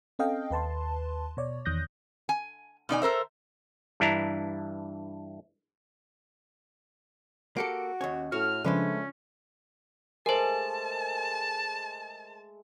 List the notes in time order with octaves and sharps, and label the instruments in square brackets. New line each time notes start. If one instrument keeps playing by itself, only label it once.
[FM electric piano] C4 C#4 A4 D#5 F5 G5
D#2 B4 A5 C6
B2 C#5 D5
E2 D#3 D#6 F#6 G6 A#6
[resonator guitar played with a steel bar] G#5
B2 D#4 D5 G#5
A4 A#4 C5 E5
[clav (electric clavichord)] G2 E3 D4 E4 A#5
[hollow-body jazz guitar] A#3 G4 A4 [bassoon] F#4 [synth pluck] C#7 D7
[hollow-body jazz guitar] D#2 C#5 [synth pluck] C#4
[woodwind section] A2 F6 [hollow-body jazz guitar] F#4
[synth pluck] C#3 F3 D4 [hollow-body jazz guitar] G#3 B4 C5 [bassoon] A3 [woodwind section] C#4
[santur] G#3 A3 [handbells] A#4 C5 [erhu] A5